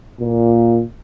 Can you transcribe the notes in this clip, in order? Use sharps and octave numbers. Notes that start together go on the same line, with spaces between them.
A#2